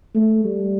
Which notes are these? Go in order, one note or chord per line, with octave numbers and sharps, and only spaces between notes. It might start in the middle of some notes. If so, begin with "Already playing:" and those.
A3
G3